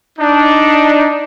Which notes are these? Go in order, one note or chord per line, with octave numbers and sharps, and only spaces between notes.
D4 D#4